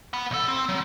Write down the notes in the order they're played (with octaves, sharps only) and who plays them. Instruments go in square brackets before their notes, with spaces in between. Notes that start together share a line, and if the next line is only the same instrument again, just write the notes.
[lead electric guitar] F#5 B5
B1 A4
C4
F#3